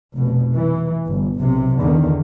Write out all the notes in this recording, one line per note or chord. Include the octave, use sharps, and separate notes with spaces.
F1 B2
E3
G1
B1 C3
E2 D3 D#3